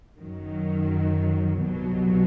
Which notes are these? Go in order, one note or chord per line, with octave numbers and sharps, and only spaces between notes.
F#2 D#3 F#3
C2 B2 F#3